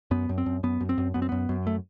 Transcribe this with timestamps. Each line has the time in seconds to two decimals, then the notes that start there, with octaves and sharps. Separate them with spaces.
0.11 F#2 B3
0.29 F#2
0.38 C4
0.46 F#2
0.63 F#2 B3
0.80 F#2
0.89 C4
0.98 F#2
1.14 F#2 B3
1.22 C4
1.29 F#2 B3
1.49 F#2
1.67 A3